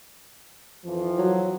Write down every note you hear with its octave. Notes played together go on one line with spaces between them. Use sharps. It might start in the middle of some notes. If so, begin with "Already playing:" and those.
F2 E3 F3
F#3